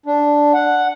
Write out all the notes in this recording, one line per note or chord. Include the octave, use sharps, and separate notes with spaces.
D4
F#5